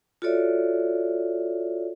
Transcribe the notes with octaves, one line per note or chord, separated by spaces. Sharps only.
F4 F#4 A4 C#5 D5 E5